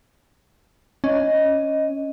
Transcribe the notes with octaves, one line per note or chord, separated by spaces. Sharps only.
C#4 D#5